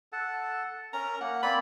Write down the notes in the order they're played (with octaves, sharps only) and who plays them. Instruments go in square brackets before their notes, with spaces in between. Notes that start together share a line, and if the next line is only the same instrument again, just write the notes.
[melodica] A4 F#5 A5
[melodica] C#4 A#4 [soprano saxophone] A#5
[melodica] A#3 [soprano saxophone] F#5
[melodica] A#3 C4 D5 [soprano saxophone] B5